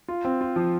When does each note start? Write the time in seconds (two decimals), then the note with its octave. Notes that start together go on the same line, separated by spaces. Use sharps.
0.08 F4
0.25 C4
0.41 F4
0.56 F3